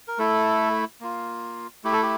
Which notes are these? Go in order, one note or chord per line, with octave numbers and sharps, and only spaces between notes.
A#4
A3 E4 A4
A#3 F4
A3 E4 G4
A4
G4